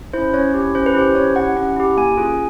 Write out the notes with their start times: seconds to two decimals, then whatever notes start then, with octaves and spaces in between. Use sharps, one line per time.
0.13 C#4 E4 C5
0.34 C#4 C#5
0.54 E4 G4
0.75 C#4 C5
0.86 B4
0.95 E4 G4 C5
1.15 C#4 C#5
1.36 E4 G4 F#5
1.56 C#4 F#5
1.76 E4 G4
1.97 A#3 G#5
2.17 C#4 F4 G#4